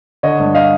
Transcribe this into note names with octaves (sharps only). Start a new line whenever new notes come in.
D3 C#5 D#5
G2
D#5 F5